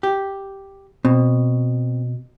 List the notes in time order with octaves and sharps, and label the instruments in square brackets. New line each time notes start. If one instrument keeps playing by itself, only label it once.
[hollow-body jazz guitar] G4
[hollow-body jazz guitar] B2 [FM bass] C4